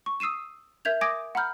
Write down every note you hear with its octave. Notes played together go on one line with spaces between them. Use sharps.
C#6
D#6 E6 C7 D#7 E7
A#4 E5 G6 G#6 F7
G#5 D6 D#6 G#6 A#6 D7
F#5 A#5 B5 F6 G6